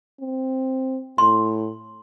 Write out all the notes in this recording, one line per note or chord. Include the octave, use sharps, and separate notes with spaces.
C4
A2 C6